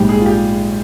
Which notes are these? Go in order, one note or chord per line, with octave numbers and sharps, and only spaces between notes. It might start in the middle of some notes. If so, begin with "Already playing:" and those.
Already playing: A#1 G#2 G3 G4
G#4
F4
G4